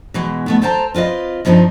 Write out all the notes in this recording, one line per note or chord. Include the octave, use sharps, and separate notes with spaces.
B2 E3 G#3
D#3 A3 B3
A4 C5 G5 A5 A#5
C4 F4 B4 D#5
G2 F3 C4 C#4 D#4